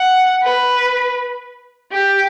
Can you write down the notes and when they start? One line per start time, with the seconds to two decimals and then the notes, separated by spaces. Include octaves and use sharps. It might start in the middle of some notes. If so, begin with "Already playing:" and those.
Already playing: F#5
0.44 B4
1.92 G4